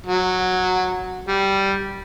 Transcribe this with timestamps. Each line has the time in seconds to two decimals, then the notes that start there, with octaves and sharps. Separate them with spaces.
0.06 F#3
1.28 G3